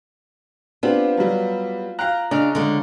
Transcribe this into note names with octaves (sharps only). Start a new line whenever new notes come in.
B3 C4 D4 F4 G4
F#3 G3
F5 G5 A#5 F#6
C#3 D4 D#5 F6
D3 G#3